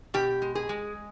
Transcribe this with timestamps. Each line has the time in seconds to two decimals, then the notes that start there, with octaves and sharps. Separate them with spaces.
0.14 B2 G4
0.42 G#3
0.55 G#4
0.69 G#3